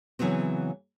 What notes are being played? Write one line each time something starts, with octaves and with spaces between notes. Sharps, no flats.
C#3 E3 F#3 B3 C4